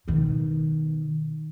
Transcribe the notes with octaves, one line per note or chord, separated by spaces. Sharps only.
B2 D#3